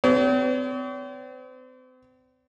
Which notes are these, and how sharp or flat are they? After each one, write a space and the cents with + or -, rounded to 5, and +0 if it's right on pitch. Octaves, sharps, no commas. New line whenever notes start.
C4 -40 C#5 +45